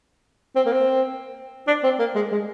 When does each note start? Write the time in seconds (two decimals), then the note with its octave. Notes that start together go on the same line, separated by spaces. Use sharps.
0.56 C4
0.66 A#3
0.72 C4
1.67 D4
1.84 C4
1.99 A#3
2.15 G#3
2.32 G#3